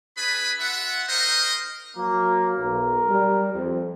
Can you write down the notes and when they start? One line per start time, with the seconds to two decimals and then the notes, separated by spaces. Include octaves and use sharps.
0.18 D4 G#4 B4 B5
0.60 F4 E5 F#5
1.07 D#4 A#4 C5 D#5
1.97 F#3 A#3
2.58 B1 A#4
3.09 G3
3.54 F2